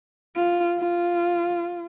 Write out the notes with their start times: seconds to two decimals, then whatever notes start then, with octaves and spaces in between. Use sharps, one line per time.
0.36 F4
0.78 F4